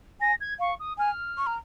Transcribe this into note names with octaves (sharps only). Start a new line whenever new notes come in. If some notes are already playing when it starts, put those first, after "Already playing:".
G#5 A#6
G#6
F5 C#6
D#6
G#5 F6
C#6
A#5